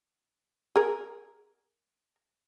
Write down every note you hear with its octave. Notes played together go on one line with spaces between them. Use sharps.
G#4 A#4